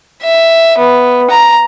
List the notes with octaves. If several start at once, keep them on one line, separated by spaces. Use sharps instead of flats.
E5
B3
A#5